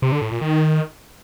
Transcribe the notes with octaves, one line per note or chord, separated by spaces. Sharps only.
C3
D3
A2
A#2
D#3